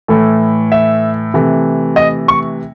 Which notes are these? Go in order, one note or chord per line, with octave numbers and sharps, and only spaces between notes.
A2 E3 A3
E5
C3 E3 A3
D#5
C#6